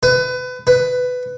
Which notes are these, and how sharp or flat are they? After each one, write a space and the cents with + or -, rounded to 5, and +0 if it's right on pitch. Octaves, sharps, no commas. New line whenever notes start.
B4 +30
B4 +15